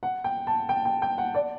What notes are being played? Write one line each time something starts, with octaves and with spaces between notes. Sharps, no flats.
F#5
G5
A5
G5
G5
G5
F#5
D5